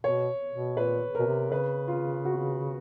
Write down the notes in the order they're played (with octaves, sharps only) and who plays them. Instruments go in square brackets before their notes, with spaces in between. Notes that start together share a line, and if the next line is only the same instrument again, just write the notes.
[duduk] B2 [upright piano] C#5
[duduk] B2
[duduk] A#2 [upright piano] B4
[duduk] B2 [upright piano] A#4
[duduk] C3
[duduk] C#3 [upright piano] B4
[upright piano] F4
F#4